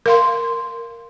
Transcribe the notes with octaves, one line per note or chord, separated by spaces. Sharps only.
A#4 F5 C6